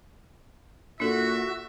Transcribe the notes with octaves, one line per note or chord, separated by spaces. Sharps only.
A#2 D4 F#4 A4 E5